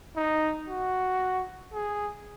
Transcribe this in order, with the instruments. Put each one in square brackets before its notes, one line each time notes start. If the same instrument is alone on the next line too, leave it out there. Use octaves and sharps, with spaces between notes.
[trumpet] D#4
F#4
G#4